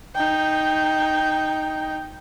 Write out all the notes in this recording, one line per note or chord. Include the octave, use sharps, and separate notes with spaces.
D#4 G5